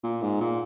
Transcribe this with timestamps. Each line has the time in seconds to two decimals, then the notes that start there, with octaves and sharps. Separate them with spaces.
0.03 A#2
0.22 G#2
0.41 A#2